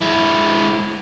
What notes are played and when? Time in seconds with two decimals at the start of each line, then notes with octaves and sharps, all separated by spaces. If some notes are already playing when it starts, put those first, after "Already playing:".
0.02 G#3 E4